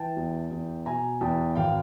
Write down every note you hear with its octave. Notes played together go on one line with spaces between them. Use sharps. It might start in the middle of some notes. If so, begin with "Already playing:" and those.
Already playing: E3 G5 A5
E2
E2
B2 G#5 A#5
E2 G5 A5
G#1 F5 G5